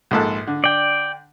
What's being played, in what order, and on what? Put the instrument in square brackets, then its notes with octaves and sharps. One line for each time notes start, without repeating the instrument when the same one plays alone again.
[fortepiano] A#1 G#2 A4
D3
[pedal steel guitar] D5 G5